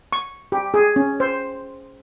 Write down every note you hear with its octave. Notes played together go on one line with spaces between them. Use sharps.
C#6
G4
G#4
C#4
C5